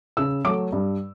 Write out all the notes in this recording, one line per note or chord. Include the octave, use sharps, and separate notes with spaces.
C#3 E6
F#3 A3 D6
G2